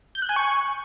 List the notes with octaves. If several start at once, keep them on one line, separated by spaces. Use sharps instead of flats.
G6
F#6
G#5
C#6